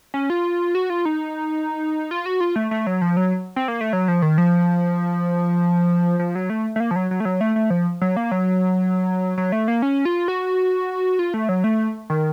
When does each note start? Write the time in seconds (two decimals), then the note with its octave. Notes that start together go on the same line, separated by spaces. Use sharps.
0.14 C#4
0.30 F4
0.75 F#4
0.90 F4
1.05 D#4
2.11 F4
2.26 F#4
2.40 F4
2.56 A3
2.71 A3
2.87 F#3
3.02 F3
3.17 F#3
3.56 C4
3.68 A#3
3.81 A3
3.93 F#3
4.08 F3
4.22 D#3
4.38 F3
6.19 F3
6.35 F#3
6.50 A3
6.76 A3
6.80 A#3
6.91 F3
6.96 F#3
7.11 F#3
7.20 A3
7.25 F#3
7.41 A3
7.56 A3
7.70 F3
8.02 F#3
8.17 A#3
8.31 F#3
9.38 F#3
9.52 A3
9.68 A#3
9.82 C#4
10.05 F4
10.28 F#4
11.19 F4
11.34 A3
11.49 F#3
11.64 A3
12.10 D#3